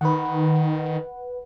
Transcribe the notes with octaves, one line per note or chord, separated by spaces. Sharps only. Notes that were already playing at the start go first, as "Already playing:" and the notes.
D#3 B4 F#5